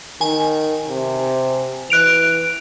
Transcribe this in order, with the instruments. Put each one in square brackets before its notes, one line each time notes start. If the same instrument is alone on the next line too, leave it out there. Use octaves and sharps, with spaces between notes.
[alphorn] D#3 [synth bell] G#5
[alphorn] C3
[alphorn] E3 [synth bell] F#6 D7 F7